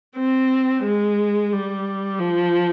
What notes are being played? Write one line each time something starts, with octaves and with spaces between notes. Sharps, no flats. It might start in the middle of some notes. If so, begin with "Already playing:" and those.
C4
G#3
G3
F3